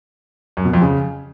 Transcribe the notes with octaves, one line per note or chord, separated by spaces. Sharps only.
F#2
B2
F2
C#3